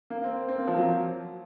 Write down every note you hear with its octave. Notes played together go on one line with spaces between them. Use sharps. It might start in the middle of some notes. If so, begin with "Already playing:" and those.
A#3
C4
C4
A#3
F3
F#3